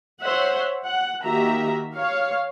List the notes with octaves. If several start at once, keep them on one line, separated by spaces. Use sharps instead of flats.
C5 C#5 E5 F#5
F#5
D#3 A#3 F#4 G4 E5 A#5
C#5 F5